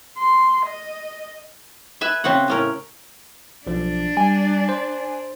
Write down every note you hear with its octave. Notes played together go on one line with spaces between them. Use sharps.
C6
D#5
B4 E5 G#5
C#3 C4 F#4 F#5
A2 C#4 A#4
B1 F3 D4
G3 G#5
C5